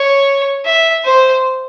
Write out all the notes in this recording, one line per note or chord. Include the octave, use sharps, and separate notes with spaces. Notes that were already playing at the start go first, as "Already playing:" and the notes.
Already playing: C#5
E5
C5